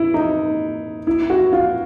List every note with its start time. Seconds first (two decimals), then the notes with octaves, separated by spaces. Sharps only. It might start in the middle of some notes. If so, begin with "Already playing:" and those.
Already playing: E4
0.14 D#4
1.07 E4
1.30 F#4
1.53 F4